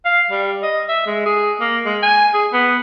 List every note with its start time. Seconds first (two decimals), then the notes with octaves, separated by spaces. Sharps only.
0.05 F5
0.31 G3
0.63 D#5
0.89 E5
1.06 G#3
1.26 G#4
1.60 A#3
1.86 G#3
2.03 G#5
2.34 G#4
2.53 B3